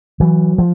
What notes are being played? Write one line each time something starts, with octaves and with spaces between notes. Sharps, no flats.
E3 F#3
F3